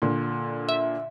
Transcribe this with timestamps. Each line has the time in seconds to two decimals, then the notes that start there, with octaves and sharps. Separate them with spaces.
0.02 A#2 D3
0.69 E5